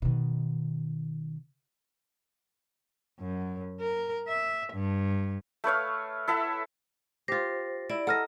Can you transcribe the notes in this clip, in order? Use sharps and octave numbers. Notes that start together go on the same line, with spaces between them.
B2 D#3
F#2
A#4
E5
G2
A3 B4 C#5 F5
E4 A4 E5 F#5
F4 G4 C5 A6 A#6
E4 D5
A4 D#5 F#5 A#5 F6 A#6